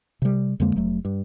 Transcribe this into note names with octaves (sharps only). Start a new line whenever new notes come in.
C3 G3
F2 D3 G#3 A#3
F1 F#3 A3
G2